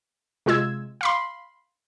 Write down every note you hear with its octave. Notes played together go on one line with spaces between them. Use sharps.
C3 G#3 F4 E6 G#6
F5 B5 C6